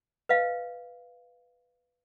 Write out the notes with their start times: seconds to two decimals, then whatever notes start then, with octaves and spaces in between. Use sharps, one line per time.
0.29 B4 D#5 F5